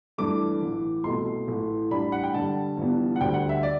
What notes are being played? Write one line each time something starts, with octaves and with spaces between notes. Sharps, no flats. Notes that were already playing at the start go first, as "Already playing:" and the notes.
G2 E3 A3 D4 D6
A1 A2 E3
C2 B2 A3 C4 C6
A1 A2 E3 A3
A1 A2 G3 D4 B5
F#5
G5
G2 D3 G3 A5
G1 G2 E3 G3 B3
F#5
D2 D3 G3 G5
F#5
E5
D5